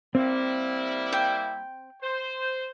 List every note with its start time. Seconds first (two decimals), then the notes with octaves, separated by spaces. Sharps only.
0.15 G3 A#3 C4 E4
1.13 G5
2.02 C5